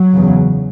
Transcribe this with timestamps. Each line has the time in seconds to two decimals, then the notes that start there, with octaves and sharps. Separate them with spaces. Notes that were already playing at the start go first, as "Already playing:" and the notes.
Already playing: F#3
0.15 E2 C#3